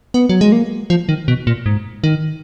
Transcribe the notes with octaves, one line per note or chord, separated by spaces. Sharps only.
B3
F#3
G#3
A#3
F3
D#3
B2
A#2
G#2
D#3